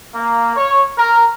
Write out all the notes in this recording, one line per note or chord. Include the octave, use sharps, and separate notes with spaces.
A#3
C#5
A#4